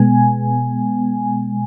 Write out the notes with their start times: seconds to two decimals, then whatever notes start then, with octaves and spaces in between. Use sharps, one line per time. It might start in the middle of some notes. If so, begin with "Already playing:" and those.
Already playing: B2 G#3 B3 G#5